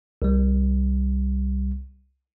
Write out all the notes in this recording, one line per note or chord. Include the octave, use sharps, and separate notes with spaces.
C2 G3